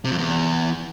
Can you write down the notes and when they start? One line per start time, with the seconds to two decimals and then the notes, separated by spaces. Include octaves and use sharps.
0.04 C3
0.11 F2
0.18 E2